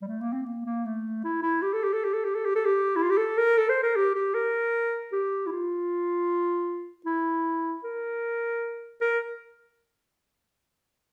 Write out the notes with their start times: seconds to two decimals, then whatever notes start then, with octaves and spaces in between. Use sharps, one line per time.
0.02 G3
0.07 A3
0.20 A#3
0.33 C4
0.46 A#3
0.66 A#3
0.85 A3
1.24 E4
1.43 E4
1.62 G4
1.73 A4
1.84 G4
1.93 A4
2.04 G4
2.14 A4
2.24 G4
2.35 A4
2.45 G4
2.55 A4
2.66 G4
2.96 E4
3.03 F4
3.10 G4
3.17 A4
3.37 A#4
3.57 A4
3.69 C5
3.83 A#4
3.96 G4
4.15 G4
4.34 A#4
5.12 G4
5.47 E4
5.51 F4
7.06 E4
7.84 A#4
9.01 A#4